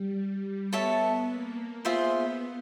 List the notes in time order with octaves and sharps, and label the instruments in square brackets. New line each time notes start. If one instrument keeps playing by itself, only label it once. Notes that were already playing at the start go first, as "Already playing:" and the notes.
Already playing: [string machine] G3
[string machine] B3 [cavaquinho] A4 C#5 E5 A5
[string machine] A#3
[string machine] B3 [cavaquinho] F4 G#4 C5 E5